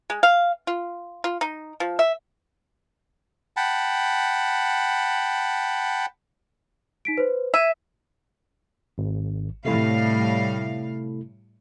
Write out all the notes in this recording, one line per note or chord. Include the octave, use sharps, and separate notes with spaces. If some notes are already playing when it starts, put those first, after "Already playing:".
G#3
F5
F4
F4
D#4
F3
E5
F#5 G5 A5 B5
D#4 B6 D7
B4 C5
E5 G#6 D#7
G#1
A2 C3 G3 A3 E4 F5